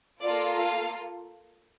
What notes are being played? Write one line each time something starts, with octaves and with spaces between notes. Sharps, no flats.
A#3 F4 A4 D5
F5